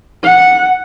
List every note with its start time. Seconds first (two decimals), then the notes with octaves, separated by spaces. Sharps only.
0.24 F#5